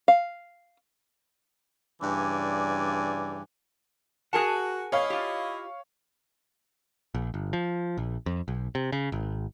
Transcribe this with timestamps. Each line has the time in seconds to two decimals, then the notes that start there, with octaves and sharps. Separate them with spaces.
0.08 F5
2.02 G2 C#3 E3 D5 G#5
4.33 F#4 G#4 A#4 F#5 G#5 A5
4.92 E4 C#5 D#5 F5
5.10 F4 G4
7.15 A#1
7.34 G1
7.53 F3
7.98 A#1
8.26 F2
8.48 B1
8.75 C3
8.92 C#3
9.12 G#1